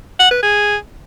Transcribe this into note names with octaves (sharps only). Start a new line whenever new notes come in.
F#5
B4
G#4